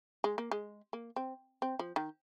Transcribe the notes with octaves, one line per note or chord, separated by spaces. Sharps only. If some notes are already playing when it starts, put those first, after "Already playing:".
G#3
A#3
G#3
A#3
C4
C4
F3
D#3